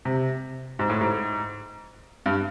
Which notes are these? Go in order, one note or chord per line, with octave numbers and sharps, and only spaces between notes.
C3
G#2
A2
G#2
G2